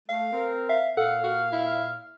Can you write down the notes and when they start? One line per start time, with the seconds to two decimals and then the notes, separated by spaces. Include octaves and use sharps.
0.09 A3 F5
0.33 C4 A#4
0.69 E5 F5
0.97 A#2 A4 F5 F#5
1.24 F#4 F6
1.52 E4